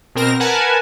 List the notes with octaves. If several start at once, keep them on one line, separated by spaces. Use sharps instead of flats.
B2 C4 A#4 A#6
A#4 B4 F#5 G#5 A5